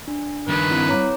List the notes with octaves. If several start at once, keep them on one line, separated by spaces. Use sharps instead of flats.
D4
G2 D#3 B4
C4 E4
C#5 A#5 D6